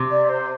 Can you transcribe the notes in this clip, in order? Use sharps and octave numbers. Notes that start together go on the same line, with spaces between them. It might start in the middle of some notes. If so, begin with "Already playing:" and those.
Already playing: C3
D5
C5